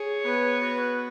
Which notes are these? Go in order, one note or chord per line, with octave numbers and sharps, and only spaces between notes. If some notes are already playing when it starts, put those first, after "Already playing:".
Already playing: G#4 C#5
B3 B4
F#4